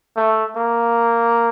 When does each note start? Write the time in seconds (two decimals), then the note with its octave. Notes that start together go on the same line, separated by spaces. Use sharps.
0.16 A3
0.56 A#3